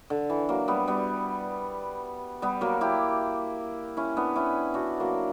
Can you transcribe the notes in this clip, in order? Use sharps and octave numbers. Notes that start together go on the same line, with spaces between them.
D3
E3
F#3 A#3
G3 B3
G3 B3
G3 B3
F#3 A#3
E4 G4
C#4 E4
B3 D4
C#4 E4
D4 F#4
F#3 A#3